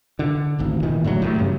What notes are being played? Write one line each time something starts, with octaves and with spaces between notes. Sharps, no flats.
D3
D#1 G#1 D2
D#1 A#2 D#3 E3
A2 D3 D#3 F#3
A1 A2
G2 C#3 F#3